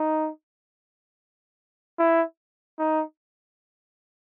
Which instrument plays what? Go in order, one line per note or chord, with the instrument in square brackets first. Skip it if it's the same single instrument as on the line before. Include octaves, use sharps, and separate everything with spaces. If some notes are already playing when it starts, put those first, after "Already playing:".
Already playing: [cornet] D#4
E4
D#4